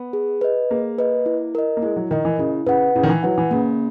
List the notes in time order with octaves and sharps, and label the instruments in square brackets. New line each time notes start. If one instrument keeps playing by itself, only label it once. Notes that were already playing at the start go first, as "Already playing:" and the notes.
Already playing: [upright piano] B3
[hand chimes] G#4
B4 D#5
[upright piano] A#3 [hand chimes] G#4
[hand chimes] B4 D#5
E4
A#4 D#5
[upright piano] A#3
[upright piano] G#3 [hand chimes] E4
[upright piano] F#3
[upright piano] D#3 [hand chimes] A#4 D#5
[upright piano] E3
[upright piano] C#3 [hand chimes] E4
[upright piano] C#3 [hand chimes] B4 F#5
[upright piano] C#3 [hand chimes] E4
[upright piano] D#3
E3
[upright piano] F#3 [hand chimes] B4 F#5
[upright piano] E3
[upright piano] C#3 [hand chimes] A#3